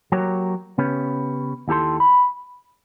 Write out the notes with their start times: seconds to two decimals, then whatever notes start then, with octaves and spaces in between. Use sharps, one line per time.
0.12 F#3 A#3 F#4 G4 A#4 C#5
0.78 C#3 B3 C#4 G4 B4
1.68 D#2 E4 G4 A4 C6
2.00 B5